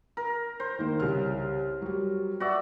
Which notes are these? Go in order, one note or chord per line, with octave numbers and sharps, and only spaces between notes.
A#4
C5
D#3 A#3
C2 C#3 F6
F#3 G3
F#4 D5 E5